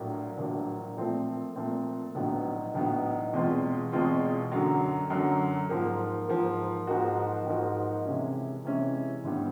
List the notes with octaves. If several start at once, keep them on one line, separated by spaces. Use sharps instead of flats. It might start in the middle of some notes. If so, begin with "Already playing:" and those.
Already playing: A#1 A2 F#3 A#3 D4
A#1 A2 F#3 A#3 D4
A#2 F3 A3 C4
A#2 F3 A3 C4
A#1 A2 F#3 B3 D#4
A#1 A2 F#3 B3 D#4
E2 B2 G#3 C4 F4
E2 B2 G#3 C4 F4
F#2 D3 F#3
F#2 D3 F#3
G#2 F3 A#3
G#2 F3 A#3
G#2 F3 A#3 D#4 F#4
G#2 F3 A#3 D#4 F#4
C3 E3 G#3 C#4 E4
C3 E3 G#3 C#4 E4
G#1 G2 E3 G3 B3